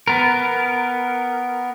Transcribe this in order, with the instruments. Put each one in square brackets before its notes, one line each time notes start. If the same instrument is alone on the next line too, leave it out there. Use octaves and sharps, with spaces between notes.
[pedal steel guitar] B3 A#4